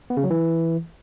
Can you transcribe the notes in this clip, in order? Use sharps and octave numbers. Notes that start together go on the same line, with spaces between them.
B3
C#3
F#3
E3